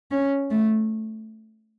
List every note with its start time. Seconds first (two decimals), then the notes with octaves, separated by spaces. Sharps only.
0.11 C#4
0.51 A3